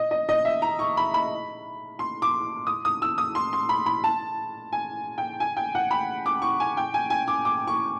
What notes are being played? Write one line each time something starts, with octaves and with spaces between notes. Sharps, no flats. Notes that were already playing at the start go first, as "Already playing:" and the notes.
Already playing: D#5
D#5
D#5
E5
A#5
C#6
B5
B5
C6
D6
D#6
D#6
E6
D#6
C6
C6
B5
B5
A5
G#5
G5
G#5
G5
F#5
B5
D6
C#6
G#5
G5
G#5
G#5
D6
D6
C#6